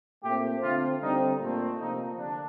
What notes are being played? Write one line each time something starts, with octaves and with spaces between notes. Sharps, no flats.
A#2 A3 C4 G4
D3 A3 C4 F4
D3 G3 C4 D#4
A#2 A3 C4
C3 F3 A#3 D#4
D3 D4